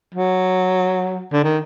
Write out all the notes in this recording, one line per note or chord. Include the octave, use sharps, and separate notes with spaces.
F#3
D3
D#3